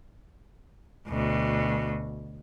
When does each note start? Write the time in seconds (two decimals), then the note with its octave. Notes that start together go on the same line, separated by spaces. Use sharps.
1.08 D2 B2